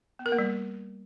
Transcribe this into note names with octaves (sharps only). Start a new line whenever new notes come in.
B3
A#4
A#3
G3